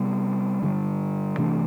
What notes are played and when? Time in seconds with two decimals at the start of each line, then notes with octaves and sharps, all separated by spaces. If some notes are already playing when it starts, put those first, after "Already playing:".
Already playing: C3 G3 B3
0.62 G2 D3 G3
1.38 C3 E3 A3 D4